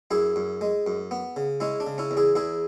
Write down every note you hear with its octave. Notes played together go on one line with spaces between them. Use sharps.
F#2 E4 G#4
F#2
G#3
F#2
B3
C#3
G#3 C#4 E4
D4
C#3
C#4 E4
E2
E4 G#4
E2 E4 G#4